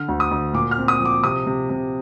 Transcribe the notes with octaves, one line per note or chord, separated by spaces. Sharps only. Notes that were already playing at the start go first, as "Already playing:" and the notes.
Already playing: D3 F6
D2
D#6
D2
A#2 D6
F6
C4
D#6
F3
D6
C3 D#6
C3
C3